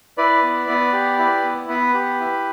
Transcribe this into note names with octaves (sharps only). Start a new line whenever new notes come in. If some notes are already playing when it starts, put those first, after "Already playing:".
E4 B4 D5
B3
B3
G4
E4
B3
B3 B4
G4
E4